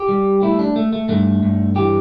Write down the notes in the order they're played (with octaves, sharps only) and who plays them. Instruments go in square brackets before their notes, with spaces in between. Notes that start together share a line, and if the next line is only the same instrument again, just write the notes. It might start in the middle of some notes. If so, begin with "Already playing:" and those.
Already playing: [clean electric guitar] G4
G3
A3 E4
D4
A3
A3
G2 A3
G2
E3 G4